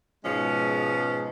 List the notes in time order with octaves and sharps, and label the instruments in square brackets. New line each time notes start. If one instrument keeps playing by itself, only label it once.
[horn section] G#2 B2 F3 G#3 C#4